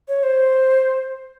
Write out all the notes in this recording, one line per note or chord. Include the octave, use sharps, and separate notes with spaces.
C#5
C5